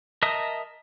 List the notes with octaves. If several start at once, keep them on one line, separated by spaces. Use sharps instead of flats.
A#4 D#5 E5 A5 D#6